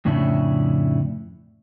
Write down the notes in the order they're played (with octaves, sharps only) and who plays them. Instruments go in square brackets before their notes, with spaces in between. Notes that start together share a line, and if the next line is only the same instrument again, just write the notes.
[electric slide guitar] F2 A2 C#3 C#4 D4 E4